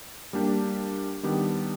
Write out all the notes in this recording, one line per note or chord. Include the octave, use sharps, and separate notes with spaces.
G3 A#3 D4 G4
D#3 G3 B3 D4 G4